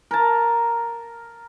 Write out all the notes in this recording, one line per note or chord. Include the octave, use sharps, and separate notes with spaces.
A#4 A5